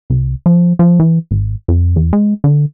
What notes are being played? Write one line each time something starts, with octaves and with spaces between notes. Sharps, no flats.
C2
F3
F3
E3
G#1
F2
E2
G#3
D3